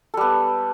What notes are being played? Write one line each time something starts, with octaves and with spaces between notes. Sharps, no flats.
G3 B3 A4